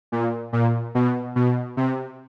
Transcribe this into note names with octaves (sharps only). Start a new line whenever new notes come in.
A#2
A#2
B2
B2
C3